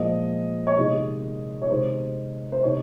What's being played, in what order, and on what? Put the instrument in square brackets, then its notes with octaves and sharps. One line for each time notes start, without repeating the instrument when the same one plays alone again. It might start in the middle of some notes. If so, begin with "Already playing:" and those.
Already playing: [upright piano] A#2 F3 G#3 D#5
C#5
C3 D#3 G#3 D#5
C#5
C3 D#3 G#3 C5
C5
C3 D#3 C#5